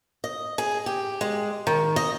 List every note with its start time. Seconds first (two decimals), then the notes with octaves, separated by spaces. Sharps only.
0.24 D#5
0.58 G#4
0.86 G4
1.21 G#3
1.67 D#3
1.96 D#5